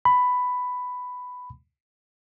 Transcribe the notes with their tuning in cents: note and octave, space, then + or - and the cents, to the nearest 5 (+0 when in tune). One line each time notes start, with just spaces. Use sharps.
B5 +10